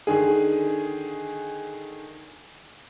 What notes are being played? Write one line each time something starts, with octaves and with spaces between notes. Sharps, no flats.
D3 D#3 G#4